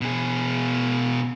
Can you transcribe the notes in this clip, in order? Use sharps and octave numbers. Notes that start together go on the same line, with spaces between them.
B2 G#4